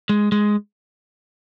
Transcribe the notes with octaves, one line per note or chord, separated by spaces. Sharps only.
G#3
G#3